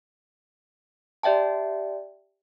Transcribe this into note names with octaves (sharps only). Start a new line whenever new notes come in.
G4 D5 E5 G5 A5